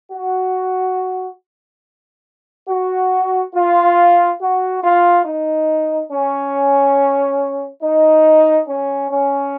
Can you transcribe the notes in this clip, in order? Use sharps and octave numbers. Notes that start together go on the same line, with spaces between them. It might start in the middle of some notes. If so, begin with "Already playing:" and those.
F#4
F#4
F4
F#4
F4
D#4
C#4
D#4
C#4
C#4